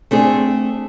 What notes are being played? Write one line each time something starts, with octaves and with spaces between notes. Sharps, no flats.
A3 C4 D4 G#4